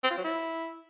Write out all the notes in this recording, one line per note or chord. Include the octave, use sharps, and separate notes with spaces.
C4
F4
F#3
E4